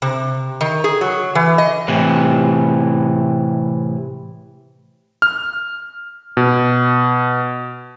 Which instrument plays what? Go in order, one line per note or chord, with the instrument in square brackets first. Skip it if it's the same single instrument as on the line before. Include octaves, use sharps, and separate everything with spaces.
[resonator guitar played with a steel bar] C3
D#3
G#4
F#3
E3
D#5
[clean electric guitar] A2 C3 E3
[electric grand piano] F6
B2